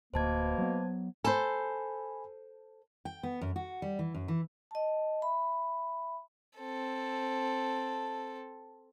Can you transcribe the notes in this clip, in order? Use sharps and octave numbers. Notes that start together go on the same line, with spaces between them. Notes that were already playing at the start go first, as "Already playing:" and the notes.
D1 D2 B2 A#3 C5 A5 G#6
F#3 B3
A4 C5 G#5 B5
G5
B3
F#2
F#4
G3
E3
F#2
E3
D#5 A5
E5 B5
C4 A4